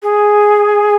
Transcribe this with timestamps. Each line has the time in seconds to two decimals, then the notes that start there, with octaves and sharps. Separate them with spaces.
0.03 G#4